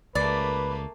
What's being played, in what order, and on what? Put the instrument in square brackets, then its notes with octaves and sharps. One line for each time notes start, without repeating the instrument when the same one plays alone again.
[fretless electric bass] C#2 [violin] A3 A#3 [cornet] B4 [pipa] D5